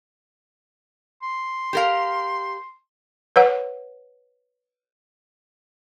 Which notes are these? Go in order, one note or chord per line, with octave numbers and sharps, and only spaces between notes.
C6
G4 A#4 F5
B4 C#5 F#5